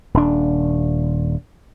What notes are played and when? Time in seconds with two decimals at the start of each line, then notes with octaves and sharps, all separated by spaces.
0.14 D#1 D4